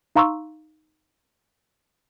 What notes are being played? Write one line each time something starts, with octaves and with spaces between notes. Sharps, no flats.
D#4 F5 A#5 C6 C#6 E6